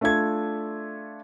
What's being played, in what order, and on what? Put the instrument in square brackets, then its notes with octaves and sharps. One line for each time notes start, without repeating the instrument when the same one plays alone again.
[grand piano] A3 D4 F4 A4 G#6